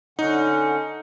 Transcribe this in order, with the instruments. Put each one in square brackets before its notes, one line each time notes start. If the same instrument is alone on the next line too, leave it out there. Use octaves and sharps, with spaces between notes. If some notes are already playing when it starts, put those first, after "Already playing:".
[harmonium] D3 C#4 F#5 [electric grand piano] D#4